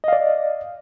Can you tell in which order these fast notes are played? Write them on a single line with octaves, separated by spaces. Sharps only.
D#5 F5 D5